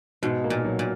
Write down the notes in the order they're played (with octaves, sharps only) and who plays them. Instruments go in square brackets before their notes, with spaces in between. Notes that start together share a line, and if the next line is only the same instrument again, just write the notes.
[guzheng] G#2 [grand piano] B2
[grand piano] A#3
[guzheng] A#2
[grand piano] F#3
[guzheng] A#2